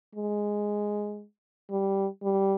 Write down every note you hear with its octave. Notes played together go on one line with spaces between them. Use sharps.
G#3
G3
G3